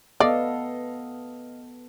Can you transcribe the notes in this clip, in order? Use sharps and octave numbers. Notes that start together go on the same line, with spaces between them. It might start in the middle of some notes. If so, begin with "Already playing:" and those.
B3 A4 D5 D#5 F5